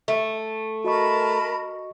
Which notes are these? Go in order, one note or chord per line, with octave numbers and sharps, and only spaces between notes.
A3
F#4 A#4 D#5 A5 B5 C#6